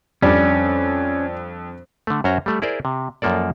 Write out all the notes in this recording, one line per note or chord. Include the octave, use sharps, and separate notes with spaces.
F2 G3 C#4 D4 D5
D3 A3
F#2 C#4 F#4 C5 A#5
G3 A3
E4 G#4 A#4 C5 D5
C3
F#2 F3 A#3 A4 D5